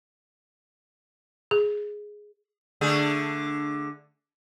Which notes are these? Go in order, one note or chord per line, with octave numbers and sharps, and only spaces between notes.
G#4
D3 A3 G#4